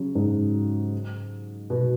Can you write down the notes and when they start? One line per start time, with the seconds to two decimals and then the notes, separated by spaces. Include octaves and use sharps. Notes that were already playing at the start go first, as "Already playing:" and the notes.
Already playing: C#3 F#3
0.15 G#2
1.70 B2